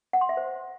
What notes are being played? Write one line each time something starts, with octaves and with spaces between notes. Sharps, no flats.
F#5
C6
E5
C5